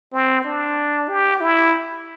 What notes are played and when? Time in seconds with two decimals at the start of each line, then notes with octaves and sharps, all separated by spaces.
0.13 C4
0.45 D4
1.09 G4
1.41 E4